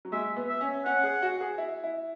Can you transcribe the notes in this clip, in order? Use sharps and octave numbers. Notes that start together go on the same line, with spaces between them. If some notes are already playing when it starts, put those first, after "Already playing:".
F#3
G#3 E5
B3
E5
C#4
C#4 F#5
G#4
F#4
G#4
E4
E4